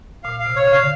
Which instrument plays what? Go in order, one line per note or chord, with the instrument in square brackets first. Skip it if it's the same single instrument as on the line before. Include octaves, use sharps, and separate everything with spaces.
[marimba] A#2 [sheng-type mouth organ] F5
[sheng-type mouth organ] F5
[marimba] C3
[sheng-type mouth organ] C#5
[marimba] C#3 [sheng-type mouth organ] F5
[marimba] D3